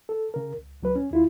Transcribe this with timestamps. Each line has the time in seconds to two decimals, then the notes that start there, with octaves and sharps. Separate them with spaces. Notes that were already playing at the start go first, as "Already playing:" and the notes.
0.09 A4
0.34 C#3 A#4
0.58 C#2
0.82 C#2 F#3 B4
0.95 C#4
1.11 D#2 E4 F4